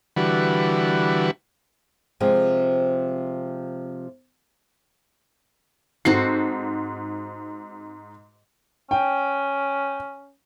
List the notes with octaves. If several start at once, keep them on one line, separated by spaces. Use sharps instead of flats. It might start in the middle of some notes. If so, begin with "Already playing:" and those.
D3 E3 G3 F#4 B4
C3 F3 G#3 C4
G#2 C4 F#4 A4 C7
C#4 G5